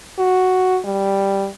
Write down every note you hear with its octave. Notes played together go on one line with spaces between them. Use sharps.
F#4
G3